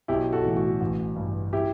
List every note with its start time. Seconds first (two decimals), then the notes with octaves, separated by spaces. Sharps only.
0.08 B1 E4 G4
0.32 F#4 A4
0.45 A2 E3
0.57 F#4
0.81 A1
1.16 G2 E3
1.53 E4 G4